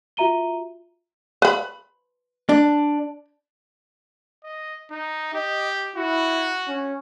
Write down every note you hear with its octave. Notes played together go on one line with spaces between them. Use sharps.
F4 F#4 E5 A#5 D#7 G7
B4 B5
D4
D#5
D#4
G4 D#5
E4 F#4
C#4